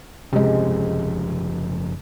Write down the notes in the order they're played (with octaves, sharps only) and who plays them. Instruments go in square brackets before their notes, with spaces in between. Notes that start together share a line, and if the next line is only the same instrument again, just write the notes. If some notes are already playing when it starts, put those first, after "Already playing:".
[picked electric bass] F#1 F3 C#4 [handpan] C3 G#3